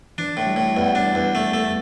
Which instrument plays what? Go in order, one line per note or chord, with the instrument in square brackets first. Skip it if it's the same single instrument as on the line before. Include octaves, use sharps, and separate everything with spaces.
[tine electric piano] E3 [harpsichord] D4
[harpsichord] A2
[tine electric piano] G3
[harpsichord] A2
[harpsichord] E2 [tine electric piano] G3
[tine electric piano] E3
[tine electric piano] E3 [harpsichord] D4
[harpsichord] E2
A3
A3